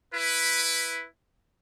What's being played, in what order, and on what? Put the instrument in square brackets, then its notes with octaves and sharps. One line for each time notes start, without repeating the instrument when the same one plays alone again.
[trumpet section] E4 B4